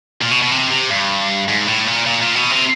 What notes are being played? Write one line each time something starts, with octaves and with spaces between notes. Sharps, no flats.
A#2
B2
B2
C3
C3
G2
G#2
A2
A#2
A#2
A#2
B2
C3